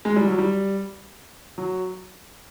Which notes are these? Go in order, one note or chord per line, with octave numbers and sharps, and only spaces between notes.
G#3
G3
F#3
G3
F#3